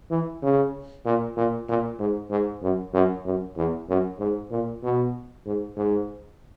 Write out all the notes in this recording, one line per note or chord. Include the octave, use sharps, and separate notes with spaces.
E3
C#3
A#2
A#2
A#2
G#2
G#2
F#2
F#2
F#2
E2
F#2
G#2
A#2
B2
G#2
G#2